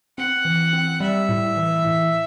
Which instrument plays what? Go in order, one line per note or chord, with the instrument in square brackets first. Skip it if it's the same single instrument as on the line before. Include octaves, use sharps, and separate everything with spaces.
[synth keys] C4 [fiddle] F#5
[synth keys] E3
C4
[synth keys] G3 [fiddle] E5
[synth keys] A2
E3
A2